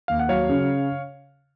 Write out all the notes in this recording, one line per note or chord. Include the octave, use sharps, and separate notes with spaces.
D#2 F5
F#5
F#3 C#5 F5
C#3